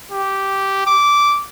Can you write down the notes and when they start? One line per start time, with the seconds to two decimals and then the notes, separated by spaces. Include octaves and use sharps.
0.12 G4
0.87 D6